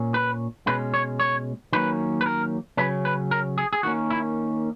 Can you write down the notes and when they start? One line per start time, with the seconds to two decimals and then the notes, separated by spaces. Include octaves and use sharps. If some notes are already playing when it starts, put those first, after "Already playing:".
Already playing: A#2 A#3 C#4
0.14 B4
0.67 B2 G#3 C#4 B4
0.94 C#5
1.20 C#5
1.73 D#3 F#3 A#3 C#4 B4
2.21 B4
2.26 A#4
2.77 C#3 F#3 C#4 B4
3.05 B4
3.31 A#4
3.58 G#4
3.73 G#4
3.83 D#3 A#3 C#4 F#4
4.10 E4